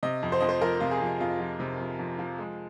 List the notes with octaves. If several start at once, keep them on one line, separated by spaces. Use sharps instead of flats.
C3 D#5
F2
C5
F2 D#5
C5
F3 A#4
C3 F4
G#4
F2
F2 F4
F3
C3
F2
F2
F3
G#3